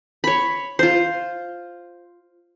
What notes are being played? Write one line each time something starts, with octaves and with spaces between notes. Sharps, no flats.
C#5 B5
F4 C5